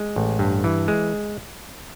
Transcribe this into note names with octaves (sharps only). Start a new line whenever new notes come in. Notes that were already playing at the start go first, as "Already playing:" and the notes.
Already playing: G#3
A1
G2
E3
G#3